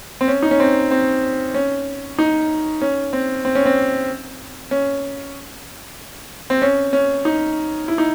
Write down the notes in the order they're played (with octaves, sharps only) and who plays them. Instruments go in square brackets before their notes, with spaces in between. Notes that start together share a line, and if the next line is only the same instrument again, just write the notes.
[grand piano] C4
C#4
D#4
C#4
C4
C4
C#4
D#4
C#4
C4
C4
C#4
C4
C#4
C4
C#4
C#4
D#4
E4
D#4